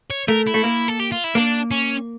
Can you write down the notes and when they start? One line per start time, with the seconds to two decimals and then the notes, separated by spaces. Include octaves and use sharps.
0.11 C#5
0.28 A3 A#4
0.47 E4
0.54 A3
0.64 A#3
0.88 A4
0.99 G4
1.12 F4
1.24 E4
1.35 A#3 D4
1.71 C#4